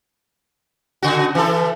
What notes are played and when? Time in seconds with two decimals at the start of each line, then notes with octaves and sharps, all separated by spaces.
1.03 C#3 F#4
1.35 E3 A4